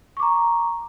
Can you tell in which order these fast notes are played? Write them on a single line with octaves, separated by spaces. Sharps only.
C#6 D6 A#5